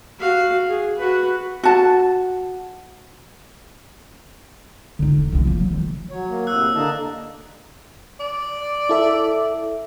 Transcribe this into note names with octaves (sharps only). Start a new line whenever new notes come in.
F#4 F5
G#4
F#4 B4
F#4 A5
D3 D#4
E1
C2 D3
F3 A#3
F#3
D#3
F#3 C#5
A#3
A2 C3 E6 F#6
D3 A#3 D#5 A5
D5
E4 A4 E5